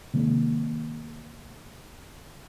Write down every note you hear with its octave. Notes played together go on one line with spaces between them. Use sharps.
C3 D#3 G#3 A#3